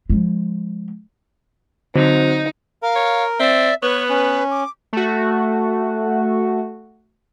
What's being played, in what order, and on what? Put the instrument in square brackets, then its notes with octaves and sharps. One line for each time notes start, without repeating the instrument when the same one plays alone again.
[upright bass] F3 G#3
[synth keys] D3 F#3 [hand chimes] C4 F#4 C5 [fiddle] D#4
[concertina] A#4 [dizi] F5
[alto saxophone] C#5
[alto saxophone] C4 [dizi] D5 [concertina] E5
[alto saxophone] B3 [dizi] B4 [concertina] C#5 C#6
[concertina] C#4
[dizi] D6
[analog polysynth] A3 F#4